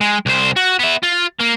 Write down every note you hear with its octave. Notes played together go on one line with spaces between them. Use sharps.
G#3
C2 C5
F#4
B3 E5
F4
A#3